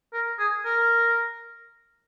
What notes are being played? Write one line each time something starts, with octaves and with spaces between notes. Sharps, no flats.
A#4
G#4
A#4